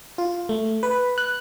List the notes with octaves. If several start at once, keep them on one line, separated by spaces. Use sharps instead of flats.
F4
A3
B4
F#6